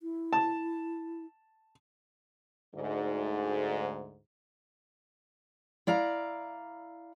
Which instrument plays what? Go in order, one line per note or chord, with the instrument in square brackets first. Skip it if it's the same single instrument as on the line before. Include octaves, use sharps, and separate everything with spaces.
[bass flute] E4
[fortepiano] A5
[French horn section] D2 G#2
[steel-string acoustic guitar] E4 D5 F5 A#5